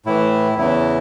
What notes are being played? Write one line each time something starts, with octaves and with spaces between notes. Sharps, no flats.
A2 E3 E4
E2 C#3 E3 E4